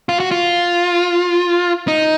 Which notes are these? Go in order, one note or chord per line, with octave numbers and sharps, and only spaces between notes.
F4
F#4
F4
D#4